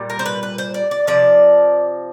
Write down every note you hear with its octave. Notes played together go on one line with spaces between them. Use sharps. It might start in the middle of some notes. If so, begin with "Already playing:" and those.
Already playing: A#2 G3
A#4
C5
B4
B4
C5
D5
D5
C3 F3 D5